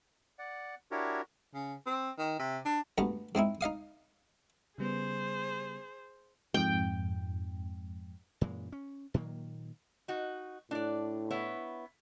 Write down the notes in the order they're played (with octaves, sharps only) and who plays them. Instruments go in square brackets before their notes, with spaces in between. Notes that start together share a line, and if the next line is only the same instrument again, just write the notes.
[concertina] D5 F#5
D4 E4 F#4 G4 A#4 C#5
[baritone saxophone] C#3
C4
D#3
C3
D4
[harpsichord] D2 G2 B3 A#5
G#2 C4 D#4 E4
D#4 D#5 F5 D#6
[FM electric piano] C#3 G3 B3 [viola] G#4 C5
[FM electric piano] F2 G#2 [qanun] G5
[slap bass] F#2 A#2 E3 G#3
C#4
A#2 D#3 F#3 A#3
[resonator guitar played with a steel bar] D#4 F#4
[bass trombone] A2 [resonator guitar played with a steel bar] D4 D5
[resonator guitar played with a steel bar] B3 E4 C#5